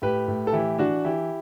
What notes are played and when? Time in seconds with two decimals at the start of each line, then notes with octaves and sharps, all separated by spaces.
0.02 A2 G4 B4
0.28 A2
0.47 A4
0.53 E3 E4 G4
0.78 E3 D4 F#4
1.04 E3 E4 G4